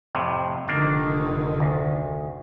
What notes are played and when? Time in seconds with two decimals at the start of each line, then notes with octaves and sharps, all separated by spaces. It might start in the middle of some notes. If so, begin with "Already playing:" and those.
0.15 F2 A2 C3
0.68 F1 D3 D#3 A#3 D4
1.60 D2